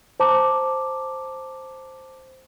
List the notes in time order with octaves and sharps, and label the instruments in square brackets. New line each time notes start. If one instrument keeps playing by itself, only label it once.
[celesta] C5 A5 A#5 D6